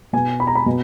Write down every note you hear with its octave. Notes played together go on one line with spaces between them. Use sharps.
B2 G#5
B5
A#5
B5
B2